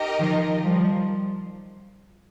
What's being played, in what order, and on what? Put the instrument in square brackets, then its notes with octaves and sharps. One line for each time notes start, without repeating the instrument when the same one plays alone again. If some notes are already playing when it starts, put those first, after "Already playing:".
Already playing: [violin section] D#4 G4 A#4 D#5
[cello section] D#3 F3
F3 G3